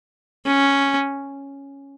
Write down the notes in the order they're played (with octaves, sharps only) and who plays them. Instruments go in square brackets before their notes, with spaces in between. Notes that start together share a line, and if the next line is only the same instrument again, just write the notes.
[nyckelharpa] C#4